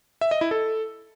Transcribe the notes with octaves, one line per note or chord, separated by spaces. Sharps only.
E5
D#5
E4
A4